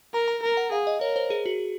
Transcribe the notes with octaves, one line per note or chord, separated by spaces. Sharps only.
A#4 A#5
A#5
A#4
F#5
G#4 F5
D#5
A#4 C#5
C5
G#4
F#4